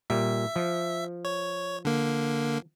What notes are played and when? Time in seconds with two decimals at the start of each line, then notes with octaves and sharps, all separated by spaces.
0.10 A#2 G3 E5
0.56 F3
1.25 C#5
1.85 D3 A#3